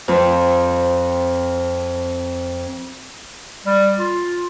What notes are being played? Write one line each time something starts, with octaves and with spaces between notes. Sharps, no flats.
F2 C4
G3
F4